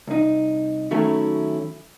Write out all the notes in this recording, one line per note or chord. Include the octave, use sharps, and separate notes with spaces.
C2 D#4
D#3 F#3 A3 C#4 E4